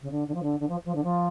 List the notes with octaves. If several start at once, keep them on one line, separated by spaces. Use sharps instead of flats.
C#3
D3
D3
F3
D3
D3
F3
F3
D3
F3